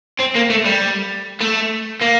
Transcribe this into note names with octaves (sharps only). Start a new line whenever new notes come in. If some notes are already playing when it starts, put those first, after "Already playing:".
C4
A#3
A3
G3
A3
A#3